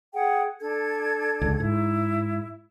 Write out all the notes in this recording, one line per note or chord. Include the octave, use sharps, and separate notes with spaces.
G#4 F#5 G5
D4 A4 G#6
C#2 D3
G#2 E4